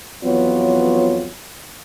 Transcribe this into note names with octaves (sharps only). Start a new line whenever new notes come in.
F2 E3 F#3 B3 F4 C#5